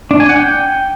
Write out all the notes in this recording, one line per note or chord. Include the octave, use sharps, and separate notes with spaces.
D4
G#5
F#5
G5